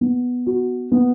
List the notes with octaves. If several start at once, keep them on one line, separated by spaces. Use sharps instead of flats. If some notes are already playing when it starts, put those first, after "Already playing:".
B3
F#4
B3